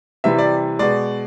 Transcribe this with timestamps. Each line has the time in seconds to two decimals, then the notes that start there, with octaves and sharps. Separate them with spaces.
0.24 C3 E3 G3 E5
0.39 D5
0.79 B2 G#3 D5